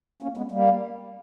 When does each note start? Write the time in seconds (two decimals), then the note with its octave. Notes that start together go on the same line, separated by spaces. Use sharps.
0.22 A#3 C#4
0.37 G#3 B3
0.52 G3 A#3